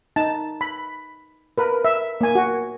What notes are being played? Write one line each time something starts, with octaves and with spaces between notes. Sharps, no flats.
D#4 A5
B5
A#4 B4
E5
A#3 G#5
F#4